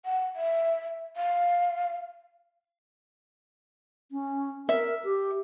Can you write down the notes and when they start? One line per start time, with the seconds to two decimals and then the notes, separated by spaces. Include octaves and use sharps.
0.05 F#5
0.36 E5
1.17 F5
4.12 C#4
4.69 A#4 E5
5.04 G4